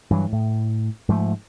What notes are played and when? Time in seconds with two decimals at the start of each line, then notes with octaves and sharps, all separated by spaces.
0.10 G2 E3 F#3
0.32 A2
1.08 G#2 F3 G#3 A3